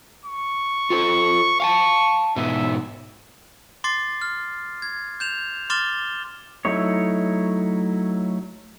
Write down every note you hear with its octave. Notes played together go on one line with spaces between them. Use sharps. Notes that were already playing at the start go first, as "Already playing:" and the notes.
C#6
F4 A4 C5
F5 G5 A5 C#6
G#2 B2 D#4 E5
C6 D6 A6 C7
F6
G#6
G6 E7 F7
C6 D6 F6 A6 E7 G7
F#3 A3 D#4 E4 C#5